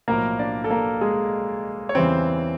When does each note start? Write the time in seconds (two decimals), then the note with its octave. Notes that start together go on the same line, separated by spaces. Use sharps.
0.08 B1 A2 F3 A#3 A#4
0.39 D4 D5
0.64 A4
0.71 A#3 A#4
1.01 G#3 G#4
1.89 C#5
1.95 E2 C#3 E3 G3 C4 C5